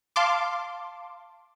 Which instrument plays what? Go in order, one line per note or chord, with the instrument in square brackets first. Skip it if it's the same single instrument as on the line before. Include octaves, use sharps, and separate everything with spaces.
[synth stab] F5 A5 C6 D6